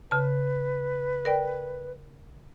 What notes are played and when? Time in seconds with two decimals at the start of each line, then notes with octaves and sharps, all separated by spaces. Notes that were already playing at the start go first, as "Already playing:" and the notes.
0.11 C#3 B4 A5
1.25 A#4 D5 G5